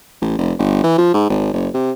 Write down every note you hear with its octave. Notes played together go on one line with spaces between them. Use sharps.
A1
F1
G1
E3
F3
G#2
G#1
F#1
C3